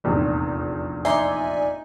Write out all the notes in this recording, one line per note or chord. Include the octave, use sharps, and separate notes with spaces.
F1 A#1 E2
D#4 D5 E5 G#5 C6